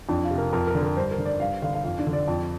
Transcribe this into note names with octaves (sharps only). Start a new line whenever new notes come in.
F2 D4
F4
C3
A#4
F2 A#4
A#4
D3
A#4
G2 C5
A#4
D3
D5
G2 F5
D3 F5
F5
F2 F5
D4
D3
D5
F2